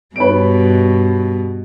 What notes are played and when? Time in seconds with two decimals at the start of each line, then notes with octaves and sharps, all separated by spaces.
0.16 G2 B2 B4 C#5 D7